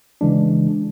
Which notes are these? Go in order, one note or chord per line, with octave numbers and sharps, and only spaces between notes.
C#3 E3 G#3 D4